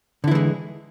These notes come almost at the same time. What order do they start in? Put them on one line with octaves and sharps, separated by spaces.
D3 E4 E3 G#3